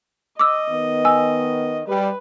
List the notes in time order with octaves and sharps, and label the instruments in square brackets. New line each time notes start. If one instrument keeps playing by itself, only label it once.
[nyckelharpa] D#5 [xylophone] D6 E6
[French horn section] D#3 B3
[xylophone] G#5 E6
[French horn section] G3 [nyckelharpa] B4